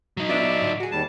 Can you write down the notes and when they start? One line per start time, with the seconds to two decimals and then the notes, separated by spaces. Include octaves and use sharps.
0.17 F#3 D#4
0.29 B3 D4 F4 D5 E5
0.62 A2 D3
0.80 F#4 G#4
0.92 D#2 G3 A5